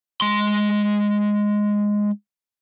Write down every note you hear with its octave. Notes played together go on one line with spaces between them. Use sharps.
G#3 C6